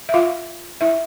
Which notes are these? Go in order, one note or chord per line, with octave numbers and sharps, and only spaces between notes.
E5
F4 F5
E4 E5